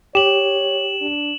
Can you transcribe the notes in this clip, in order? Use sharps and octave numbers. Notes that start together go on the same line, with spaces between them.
G4 C#5 E7 F#7
D4